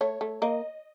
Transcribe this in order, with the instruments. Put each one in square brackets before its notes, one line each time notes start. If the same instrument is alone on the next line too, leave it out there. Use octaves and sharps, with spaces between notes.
[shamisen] A3 [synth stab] C#5
[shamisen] A3
[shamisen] A#3 [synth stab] D#5